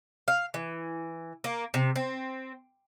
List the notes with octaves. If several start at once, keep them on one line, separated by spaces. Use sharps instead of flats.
F5
E3
A#3
C3
C4